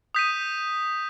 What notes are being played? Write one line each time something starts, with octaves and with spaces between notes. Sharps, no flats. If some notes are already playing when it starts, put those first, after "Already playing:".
D#6 G6 B6 D#7